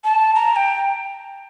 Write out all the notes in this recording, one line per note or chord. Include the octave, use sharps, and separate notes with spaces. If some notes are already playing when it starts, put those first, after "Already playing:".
A5
A#5
G5